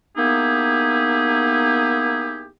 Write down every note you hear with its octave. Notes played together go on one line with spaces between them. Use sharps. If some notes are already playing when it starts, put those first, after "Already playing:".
A#3 B3 D#4 E4 G4 G#4